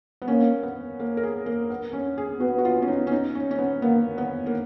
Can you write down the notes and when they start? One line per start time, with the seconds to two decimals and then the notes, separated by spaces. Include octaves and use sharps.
0.22 B3
0.28 A#3 C#4
0.63 B3
1.00 A#3
1.17 A#4
1.23 G#4
1.46 A#3
1.70 B3
1.93 C#4
2.18 G#4
2.40 B3 F#4
2.58 F#4
2.65 F4
2.82 C#4
2.88 D#4
3.07 C#4
3.12 D#4
3.35 C#4
3.51 C#4
3.58 B3
3.82 A#3 B3
4.18 B3
4.46 A#3